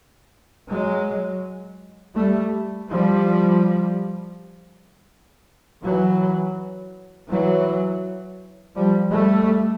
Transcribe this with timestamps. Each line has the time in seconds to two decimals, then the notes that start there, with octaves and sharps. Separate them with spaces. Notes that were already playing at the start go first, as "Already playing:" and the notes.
0.69 F#3 G#3
2.16 G3 A3
2.90 F3 G3
5.82 E3 F#3
7.29 E3 F#3
8.76 F3 G3
9.12 G3 A3